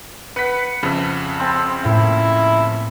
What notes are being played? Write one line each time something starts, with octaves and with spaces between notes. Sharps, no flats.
B4 F#5 B5 G6 B6
F2 C#3 B4 E5
C4 A5 B5 C6 A6
A2 A#3 E4